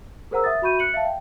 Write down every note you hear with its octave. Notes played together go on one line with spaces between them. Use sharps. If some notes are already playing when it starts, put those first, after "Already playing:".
G#4 A#4 C5 F#5 A#5 E6
E5 F#5 D#6 A6
F#4 E5 B5 C#6 G6 D#7
F#6 C#7 F#7
E5 F5 A5
G5